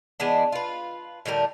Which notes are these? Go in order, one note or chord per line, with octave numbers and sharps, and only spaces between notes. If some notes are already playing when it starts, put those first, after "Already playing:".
E3 G#3 B3 D4
F4 B4
A2 D3 G3 A#4